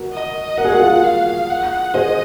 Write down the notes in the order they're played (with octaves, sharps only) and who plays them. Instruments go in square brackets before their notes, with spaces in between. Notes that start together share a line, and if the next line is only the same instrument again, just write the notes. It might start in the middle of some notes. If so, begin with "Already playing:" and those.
Already playing: [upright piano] F#4 A#4
[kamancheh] D#5
[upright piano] A#4 [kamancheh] F#5
[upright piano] G#4
F#4 A#4
F4 G#4
[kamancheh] F5
F#5
[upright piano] G#4 C5 [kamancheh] D#5